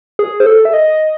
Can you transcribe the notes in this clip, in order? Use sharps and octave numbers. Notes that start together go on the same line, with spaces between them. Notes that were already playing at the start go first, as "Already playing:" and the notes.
G#4
C5
A4
E5
D#5